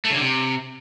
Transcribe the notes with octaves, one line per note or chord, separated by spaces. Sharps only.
A3
C#3
D3
C3